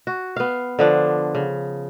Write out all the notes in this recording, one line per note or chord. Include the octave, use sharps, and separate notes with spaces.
F#4
B3 F5
D3 F3 D4
C#3